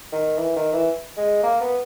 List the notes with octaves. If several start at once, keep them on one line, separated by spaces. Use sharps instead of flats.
D#3
E3
D#3
E3
G#3
A#3
B3